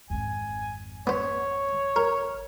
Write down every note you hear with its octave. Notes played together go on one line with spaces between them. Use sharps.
G#1 F2 G#5
B3 C5 C#5
A#4